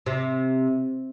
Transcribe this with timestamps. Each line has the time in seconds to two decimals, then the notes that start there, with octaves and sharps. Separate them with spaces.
0.06 C3